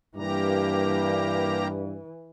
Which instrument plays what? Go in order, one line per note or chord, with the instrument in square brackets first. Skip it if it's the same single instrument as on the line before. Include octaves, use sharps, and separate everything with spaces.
[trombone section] G2 [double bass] E3 [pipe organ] A#3 G4 A#5